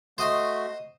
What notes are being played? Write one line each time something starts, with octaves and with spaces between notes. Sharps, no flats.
A3 F#4 C5 D#5 C6